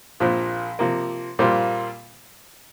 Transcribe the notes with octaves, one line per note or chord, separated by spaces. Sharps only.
A#1 A#2 F3 C4
C3 F3 A#3
A#2 G3 C4 F4